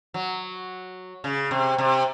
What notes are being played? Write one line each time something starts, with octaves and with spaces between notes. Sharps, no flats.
F#3
C#3
C3
C3